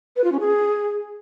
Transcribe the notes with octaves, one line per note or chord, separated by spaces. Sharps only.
B4
F4
C#4
G#4